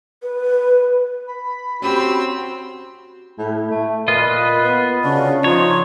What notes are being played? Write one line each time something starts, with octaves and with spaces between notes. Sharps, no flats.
B4
B5
C4 C#4 F#4 G4 E6
A2
A3
A#2 F4 B4 D#5
B3
C#3 D4 F#4
F3 D#4 F4 C#5